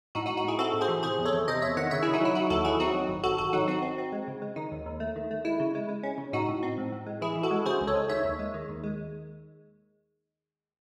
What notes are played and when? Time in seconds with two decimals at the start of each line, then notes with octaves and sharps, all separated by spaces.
0.15 A2 D#4 F#4
0.26 D#4 F#4
0.30 A2
0.37 D#4 F#4
0.44 A2 E4 G#4
0.59 C4 F#4 A4
0.73 A2
0.81 G#4 C5
0.88 E3
1.03 C3 G#4 C5
1.18 E2
1.25 A4 C#5
1.33 E2
1.48 C3 C5 D#5
1.62 E2 C#5 E5
1.77 D#3 D#5 F#5
1.91 C#3 C#5 E5
2.02 F#3 E4 G#4
2.13 D#4 F#4
2.21 F#3 E4
2.35 F#3 D#4 F#4
2.50 D#2 F#4 A4
2.65 F#3 E4 G#4
2.80 C4 D#4 F#4
2.95 F#3
3.09 G#1
3.24 G#1 F#4 A4
3.38 G#1 F#4 A4
3.53 F#3 D#4 F#4
3.68 C4 D#4 F#4
3.82 C4
3.98 C4
4.12 G#3
4.28 C#3
4.42 G#3
4.56 D#3 D#4
4.72 D#2
4.86 D#2
5.00 A3
5.16 D#3
5.31 A3
5.45 G#3 E4
5.60 C#3
5.75 G#3
5.89 G#3
6.03 C#4
6.18 C#3
6.33 A2 D#4 F#4
6.48 A2
6.63 C4
6.78 A2
6.92 A2
7.06 G#3
7.21 E3 E4 G#4
7.36 E3
7.43 F#4 A4
7.51 G#3
7.66 C#3 G#4 C5
7.81 C#2
7.87 A4 C#5
7.96 G#3
8.09 D#3 C#5 E5
8.24 D#2
8.39 G#3
8.54 D#3
8.69 D#2
8.84 G#3